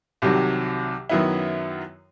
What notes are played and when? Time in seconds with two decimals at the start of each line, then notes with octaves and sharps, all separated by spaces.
0.22 C2 C3 D#3 F#3
1.09 F#2 D#3 F#3 B3 E4